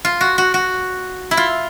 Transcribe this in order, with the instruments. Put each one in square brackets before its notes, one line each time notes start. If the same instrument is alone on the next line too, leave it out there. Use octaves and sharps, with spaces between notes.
[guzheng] F4
F#4
F#4
F#4
E4
F4